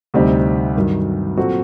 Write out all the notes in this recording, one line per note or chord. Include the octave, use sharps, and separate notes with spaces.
D2 C3 G3 C4 D#4
G2 D#3 F#3
A#2 F#3 C4 F#4 A4